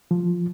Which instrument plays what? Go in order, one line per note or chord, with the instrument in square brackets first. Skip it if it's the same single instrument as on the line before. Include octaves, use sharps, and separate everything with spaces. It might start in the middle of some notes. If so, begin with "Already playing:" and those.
[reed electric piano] F3